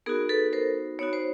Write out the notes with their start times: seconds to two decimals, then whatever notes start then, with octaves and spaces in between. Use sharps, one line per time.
0.06 B3 D#4 F#4 G#4 A#4
0.29 A4 B4
0.53 A#4 C5
0.99 B3 D#4 F#4 C#5
1.13 C5